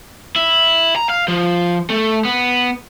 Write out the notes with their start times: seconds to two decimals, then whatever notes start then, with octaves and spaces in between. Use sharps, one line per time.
0.36 E4
0.96 A#5
1.09 F5
1.28 F3
1.90 A3
2.25 B3